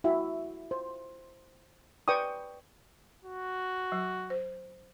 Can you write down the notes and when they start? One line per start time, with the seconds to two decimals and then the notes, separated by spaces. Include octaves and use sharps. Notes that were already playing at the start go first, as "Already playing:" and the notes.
0.04 E4 F#4 E5
0.71 C5
2.08 B4 D5 G5 C#6 D#6
3.24 F#4
3.92 F#3
4.30 C5